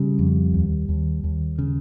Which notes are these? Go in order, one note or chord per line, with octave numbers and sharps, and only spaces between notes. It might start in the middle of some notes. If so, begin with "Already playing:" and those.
Already playing: C#3 G3
F2
D#2
D#2
D#2
C#3